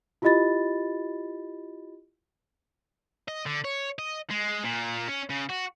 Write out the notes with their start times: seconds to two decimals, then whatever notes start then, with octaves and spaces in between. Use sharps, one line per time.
0.22 E4 F4 G4 D#5 B5 A6
3.28 D#5
3.46 D3
3.65 C#5
3.99 D#5
4.30 G#3
4.64 A#2
5.08 C#4
5.30 C#3
5.49 F#4